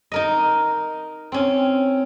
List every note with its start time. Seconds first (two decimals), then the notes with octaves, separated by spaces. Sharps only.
0.12 D#4 A#4 D#5
1.32 C4 C#4